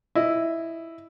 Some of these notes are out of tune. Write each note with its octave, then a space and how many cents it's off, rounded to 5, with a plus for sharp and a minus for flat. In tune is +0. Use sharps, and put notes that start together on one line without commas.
E4 +0 D#5 +0